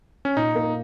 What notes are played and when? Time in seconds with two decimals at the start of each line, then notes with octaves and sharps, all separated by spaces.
0.25 C#4
0.37 A#2 D#4
0.55 A#3